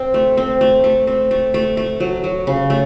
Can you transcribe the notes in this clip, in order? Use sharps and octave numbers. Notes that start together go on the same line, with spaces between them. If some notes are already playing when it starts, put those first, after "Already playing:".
Already playing: C4
A3
C4
A3
A3
C4
A3
A3
A3
F#3
F#3
C#3
A3